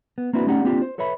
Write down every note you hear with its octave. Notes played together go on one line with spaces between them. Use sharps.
B3
A#3 C4 D4 E4 F#4 B4
A3 C#4 D#4 G4 D5 F#5
A#3 C4 D4 F4 G4
C5
A4 B4 C#5 E5 B5